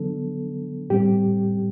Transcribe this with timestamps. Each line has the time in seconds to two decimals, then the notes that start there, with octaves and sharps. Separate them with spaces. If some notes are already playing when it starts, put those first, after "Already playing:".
Already playing: D3 F#3 B3 D4 A4
0.90 A2 G3 C4 G4